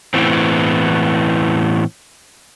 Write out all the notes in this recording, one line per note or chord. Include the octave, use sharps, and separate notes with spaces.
A2 E3 B3 C4